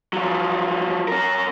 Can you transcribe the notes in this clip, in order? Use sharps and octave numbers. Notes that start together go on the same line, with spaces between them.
F3 F#3
C#4 A#4